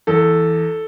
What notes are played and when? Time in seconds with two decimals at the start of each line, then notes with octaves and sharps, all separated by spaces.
0.07 E2 A4